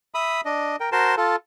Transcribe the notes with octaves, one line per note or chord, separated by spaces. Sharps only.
E5 B5 D#6
D4 D#5
A#4 G5
F#4 A#4 C5 A5 C6
F4 A4